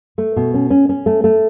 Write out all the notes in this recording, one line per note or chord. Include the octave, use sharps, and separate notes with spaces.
A3
B2
C#4
C#4
C#4
A3
A3